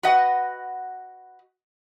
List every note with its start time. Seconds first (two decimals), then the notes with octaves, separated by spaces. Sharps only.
0.03 F#4 B4 D#5 F#5